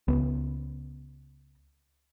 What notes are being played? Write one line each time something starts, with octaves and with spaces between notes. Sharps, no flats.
C#2 B3